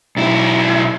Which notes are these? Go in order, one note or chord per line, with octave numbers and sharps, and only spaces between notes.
B1 E4